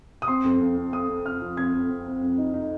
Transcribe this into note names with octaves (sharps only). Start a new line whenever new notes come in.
D#6
C4 C6
F2
F2
C4
C4 D#6
C4
F2 F6
F3
F2 G#6
F2
C4
C4
F2
D#4
D#4